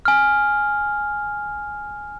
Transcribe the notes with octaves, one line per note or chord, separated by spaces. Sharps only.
G#5 F6